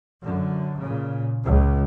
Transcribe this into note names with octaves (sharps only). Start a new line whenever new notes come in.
F#2 D3
A#2 C#3
C#2